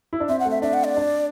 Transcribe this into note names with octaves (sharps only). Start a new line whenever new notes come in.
E4
D4
C4 E5
F#5
A3
E5
D4 E5
F#5
D5
D4